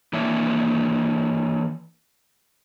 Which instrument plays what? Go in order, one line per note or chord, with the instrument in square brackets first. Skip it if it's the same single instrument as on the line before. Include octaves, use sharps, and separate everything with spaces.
[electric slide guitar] E3 A#3 D4 C#5 E5